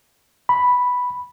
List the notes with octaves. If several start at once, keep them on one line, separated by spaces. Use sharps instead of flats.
B5